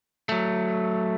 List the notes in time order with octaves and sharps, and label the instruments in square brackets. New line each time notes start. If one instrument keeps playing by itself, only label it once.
[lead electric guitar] F#3 A3